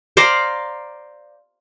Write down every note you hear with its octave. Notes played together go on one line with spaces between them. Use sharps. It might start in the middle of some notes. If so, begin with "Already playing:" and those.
C5 D5 F5 A#5